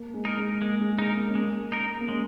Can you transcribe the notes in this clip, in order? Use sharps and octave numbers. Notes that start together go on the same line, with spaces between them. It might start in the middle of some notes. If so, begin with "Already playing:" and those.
Already playing: A#3
G#3
D#4 A#4
G#3
G#3 A#3
G#3
G#3 D#4 A#4
A#3
C#4
G#3 A#3
D#4 A#4
A#3
G#3 C#4